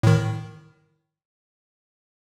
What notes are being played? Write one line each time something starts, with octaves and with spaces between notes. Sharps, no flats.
A2 D#3